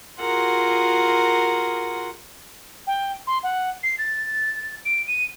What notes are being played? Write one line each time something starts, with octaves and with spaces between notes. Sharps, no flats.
F4 F#4 G#4 A#4 F#5 C6
G5
C6
F#5
C7
A6
D7
D#7